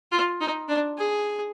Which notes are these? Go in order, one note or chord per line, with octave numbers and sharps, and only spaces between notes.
F4
D#4
D4
G#4